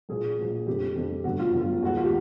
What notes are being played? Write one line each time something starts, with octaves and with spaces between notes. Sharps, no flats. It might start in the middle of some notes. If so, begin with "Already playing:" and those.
A#1 A#2 F#3 G#4
A#1 A#2 F#3
F2 D3 G3 G4
F2 D3 G3
G1 F#2 D3 F#4
F4
G1 F#2 D3
F4
D#2 D#3 G#3 F#4
F4
G4